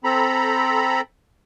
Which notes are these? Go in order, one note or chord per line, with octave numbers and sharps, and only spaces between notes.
C4 A4 A#5 B5